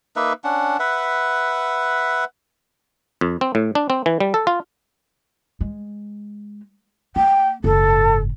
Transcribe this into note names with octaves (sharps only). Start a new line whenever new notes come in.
A#3 D#4 B4 E5
C#4 D4 F#5
B4 E5 F#5
F2
C4
A2
D4
C4
E3
G3
A4
F4
G#3
A#3 G5
F#1 G#2 A4